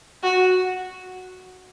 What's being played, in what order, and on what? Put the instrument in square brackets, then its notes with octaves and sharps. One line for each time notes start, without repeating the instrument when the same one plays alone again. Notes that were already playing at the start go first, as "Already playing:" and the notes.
[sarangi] F#4